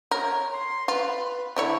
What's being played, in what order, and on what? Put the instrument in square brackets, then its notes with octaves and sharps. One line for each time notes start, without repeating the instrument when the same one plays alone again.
[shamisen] A#4 [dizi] C#5
[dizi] C6
[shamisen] F4 [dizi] B4
[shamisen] D3 E4 C#5 [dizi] D5